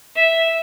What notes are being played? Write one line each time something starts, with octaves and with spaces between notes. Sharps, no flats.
E5